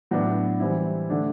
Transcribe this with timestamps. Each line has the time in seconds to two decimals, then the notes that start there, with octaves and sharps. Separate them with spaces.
0.11 A2 F#3 B3 D4
0.60 E3 G3 C4 E4
1.10 D3 A3 D4